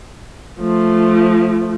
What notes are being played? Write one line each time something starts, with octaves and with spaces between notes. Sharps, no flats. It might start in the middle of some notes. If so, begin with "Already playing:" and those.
F3 A3